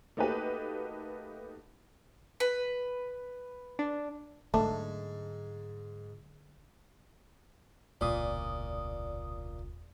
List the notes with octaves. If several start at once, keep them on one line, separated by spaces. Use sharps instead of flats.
A3 A#3 D#4 F#4 G4 B4
B4
D4
G#2 D3 F#3 A3 D4
E1 C#2 A#2 D5 D#6